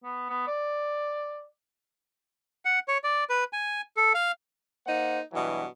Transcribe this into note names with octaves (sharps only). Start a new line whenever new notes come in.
B3
B3
D5
F#5
C#5
D5
B4
G#5
A4
F5
A#3 D#4 C5 F#5
G2 B2 E3 F#3